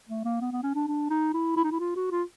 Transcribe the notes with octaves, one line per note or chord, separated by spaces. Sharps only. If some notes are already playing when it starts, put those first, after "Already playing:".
A3
A#3
B3
B3
C#4
D4
D4
D#4
E4
E4
D#4
E4
F4
F#4
F4